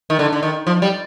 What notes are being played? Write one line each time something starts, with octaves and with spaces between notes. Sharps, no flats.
D#3
D3
D3
D#3
F3
G3